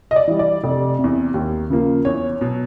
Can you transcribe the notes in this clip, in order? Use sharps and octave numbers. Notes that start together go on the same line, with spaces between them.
D#5
D5
E3 G3
D5
F1
C3
E2
D#2
C#3 F3 A#3
E2 C#5
B2 F#3